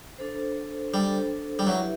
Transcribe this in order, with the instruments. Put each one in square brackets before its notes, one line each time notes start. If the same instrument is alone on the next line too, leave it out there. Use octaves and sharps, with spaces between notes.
[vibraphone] D4 A4 C5
[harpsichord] G3 [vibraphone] D4 A4 C5
[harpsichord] G3
[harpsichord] F#3 [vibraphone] E4 G4 B4 E5